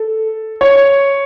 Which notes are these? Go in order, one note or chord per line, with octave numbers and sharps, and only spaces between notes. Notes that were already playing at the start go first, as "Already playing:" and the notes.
Already playing: A4
C#5